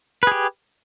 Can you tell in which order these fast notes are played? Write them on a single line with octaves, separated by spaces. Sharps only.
B4 G#4 G4